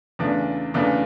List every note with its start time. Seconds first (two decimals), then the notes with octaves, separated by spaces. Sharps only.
0.19 E2 C#3 E3 A3 D4
0.74 E2 C#3 E3 A3 D4